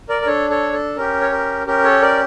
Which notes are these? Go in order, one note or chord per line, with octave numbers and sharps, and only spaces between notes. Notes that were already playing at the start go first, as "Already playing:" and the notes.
A#4 D5
A#4
D4 A4 C#5
A4 C#5
A4
C#4 G4 A#4
C#5
A#4
C#4 G4 A#4
A4 C#5
A#4 D5